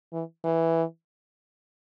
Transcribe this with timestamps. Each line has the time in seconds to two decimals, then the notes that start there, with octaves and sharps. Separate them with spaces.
0.13 E3
0.44 E3